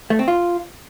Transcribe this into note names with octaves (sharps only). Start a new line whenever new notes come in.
A3
C4
F4